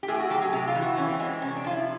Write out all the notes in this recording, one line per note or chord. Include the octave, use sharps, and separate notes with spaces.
G4
A2 G#4
G4
F#4
F#3 G4
G#4
C3 G4
F4
E3
F#4
E3 C#4
C4
G#3 C4
C4
C3 C#4
D4
F3 F4
E4